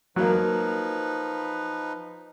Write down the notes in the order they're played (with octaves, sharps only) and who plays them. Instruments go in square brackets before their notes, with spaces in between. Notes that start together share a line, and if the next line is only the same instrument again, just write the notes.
[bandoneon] F3 D#4 B4 [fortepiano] F#3 A#3